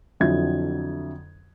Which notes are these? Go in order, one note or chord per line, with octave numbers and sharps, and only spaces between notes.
F2 D3 F#3 E4 G#6